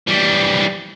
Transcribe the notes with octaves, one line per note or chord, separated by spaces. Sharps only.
E3 G3